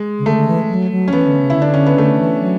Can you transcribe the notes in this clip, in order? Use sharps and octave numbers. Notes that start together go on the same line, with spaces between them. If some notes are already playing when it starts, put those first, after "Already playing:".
Already playing: G#3
C#3
D3 A3
D3
E3
F#3
F#3
C#4
E3 B3
D3
C#3
E4
D3
D4
C#4
B3
D3 A3
D3
E3
F#3